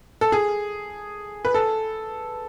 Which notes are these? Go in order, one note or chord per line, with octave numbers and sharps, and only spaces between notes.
A4
G#4
B4
A4